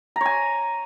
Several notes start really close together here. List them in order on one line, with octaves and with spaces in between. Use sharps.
A#5 C#5 G#5